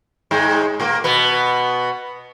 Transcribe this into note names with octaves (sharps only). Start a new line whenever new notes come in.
G#2 G#3
A#2 A#3
B2 B3